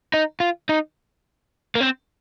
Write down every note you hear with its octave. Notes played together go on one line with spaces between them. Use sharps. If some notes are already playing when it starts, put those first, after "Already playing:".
D#4
F4
D#4
A#3
C4